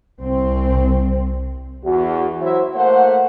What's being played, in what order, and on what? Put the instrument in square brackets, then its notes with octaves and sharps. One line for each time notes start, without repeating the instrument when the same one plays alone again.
[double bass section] C2 C4
[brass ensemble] E2 F#4
F#3 E4 F#4 C5 E5
A3 A#3 C5 F#5